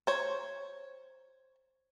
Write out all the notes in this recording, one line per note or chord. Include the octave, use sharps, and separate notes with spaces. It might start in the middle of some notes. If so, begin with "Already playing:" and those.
C5 C#5